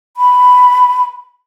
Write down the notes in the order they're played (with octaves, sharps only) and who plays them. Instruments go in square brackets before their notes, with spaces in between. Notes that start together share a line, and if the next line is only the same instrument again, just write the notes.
[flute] B5